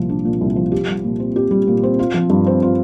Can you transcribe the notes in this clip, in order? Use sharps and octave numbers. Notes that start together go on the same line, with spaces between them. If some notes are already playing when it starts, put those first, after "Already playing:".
Already playing: C2 A#2 F3
D4
A#2
C2
F3
G4
G3
A#2
C4
G4
G3
A#2
C4
F4
F3
G2
C4
F4